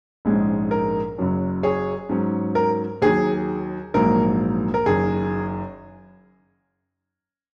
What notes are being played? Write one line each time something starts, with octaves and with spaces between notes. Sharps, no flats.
A#1 G#2 G#3 C#4
A#4
F#1 F#2 F#3 C#4
G#4 C#5
G#2 F#3 C#4
A#4
D#2 D#3 F#3 G#4
A#1 G#2 F#3 A#3 A#4
A#4
F#1 F#2 D#3 G#4